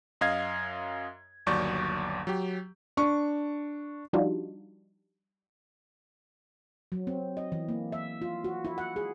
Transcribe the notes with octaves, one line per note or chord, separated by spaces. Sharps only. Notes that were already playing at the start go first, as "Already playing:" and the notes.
F#2 D#5 F5 G#6
G1 D#2 F#3 D5 C#6 G6
F#3 G4
D4 C#6
F3 G3 D4 D#4 F4 F#4
F#3
C4
D#5
E3
A#3
E5
F4
F#4
E4
F#5
G#4